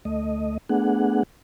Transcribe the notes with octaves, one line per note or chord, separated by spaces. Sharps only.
D2 A3 D#5
A3 B3 D4 G#4 F#5